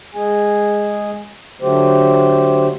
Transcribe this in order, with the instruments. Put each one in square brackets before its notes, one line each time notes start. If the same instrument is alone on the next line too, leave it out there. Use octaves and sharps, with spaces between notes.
[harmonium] G#3 G#4 G#5
D3 F#3 A3 G4 C5